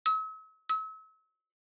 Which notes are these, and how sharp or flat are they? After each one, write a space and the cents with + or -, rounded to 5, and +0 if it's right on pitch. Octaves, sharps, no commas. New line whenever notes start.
E6 -45
E6 -40